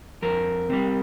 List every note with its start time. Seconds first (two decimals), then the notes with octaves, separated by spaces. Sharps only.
0.22 F2 A#4
0.69 C3 G3